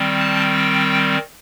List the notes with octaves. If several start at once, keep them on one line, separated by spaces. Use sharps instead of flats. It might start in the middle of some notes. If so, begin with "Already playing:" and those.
Already playing: D#3 G3 C4
A5
G5